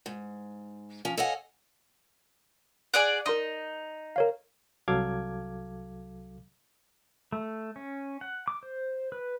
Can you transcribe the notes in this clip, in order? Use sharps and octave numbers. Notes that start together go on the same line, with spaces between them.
G#2
F3 C#4
A4 C#5 D#5 F5 F#5 G#5
G#4 D5 F#5
D#4 A#4 C6 D#6
A#4 C#5 F5
C2 F#3 A4 F5 D6 G#6
A3
C#4
F#5
D6
C5
B4